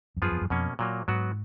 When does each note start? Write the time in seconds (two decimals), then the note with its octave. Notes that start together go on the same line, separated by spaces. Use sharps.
0.17 F2
0.22 F#2 F3 B3 F4 G#4
0.32 F2
0.41 F#2
0.50 F2 B2 A#3 C#4
0.79 A#2 F#3 A#3
1.08 G#2 F#3 B3 F#4